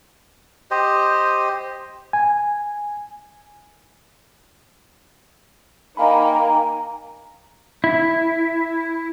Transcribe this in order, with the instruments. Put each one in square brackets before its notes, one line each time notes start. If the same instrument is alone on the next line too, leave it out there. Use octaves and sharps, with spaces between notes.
[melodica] G4 C5 D#5
[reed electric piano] G#5
[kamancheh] A#3 D#4 [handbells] D#5 F5 B5 [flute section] G5 G#5 A#5
[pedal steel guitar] E4